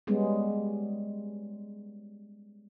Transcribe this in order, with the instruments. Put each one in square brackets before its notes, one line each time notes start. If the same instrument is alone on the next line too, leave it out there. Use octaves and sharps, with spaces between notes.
[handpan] G3 G#3 B3 C#4